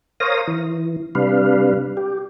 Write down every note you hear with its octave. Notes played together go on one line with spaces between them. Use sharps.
A#4 C5 C#5 F5 D#6 A#6
E3
C3 G3 D4 B4 F5
G4